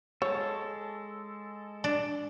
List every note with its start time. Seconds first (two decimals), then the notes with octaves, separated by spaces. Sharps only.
0.22 G#3 A4 C#5
1.84 D4